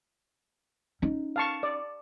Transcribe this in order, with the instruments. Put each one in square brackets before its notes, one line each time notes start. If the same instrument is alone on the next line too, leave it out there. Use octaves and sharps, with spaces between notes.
[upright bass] C#4 D#4
[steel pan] F5 A5 C#6
D5